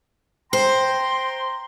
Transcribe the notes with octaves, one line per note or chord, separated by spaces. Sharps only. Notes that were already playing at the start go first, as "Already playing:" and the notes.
C5 G5 A#5 C6